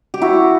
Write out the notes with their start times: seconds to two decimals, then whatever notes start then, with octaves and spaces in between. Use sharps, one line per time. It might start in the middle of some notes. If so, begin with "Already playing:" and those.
0.14 G4
0.21 E4 F#4